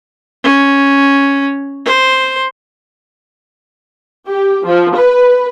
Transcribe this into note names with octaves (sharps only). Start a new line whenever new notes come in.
C#4
C5
G4
F3
B4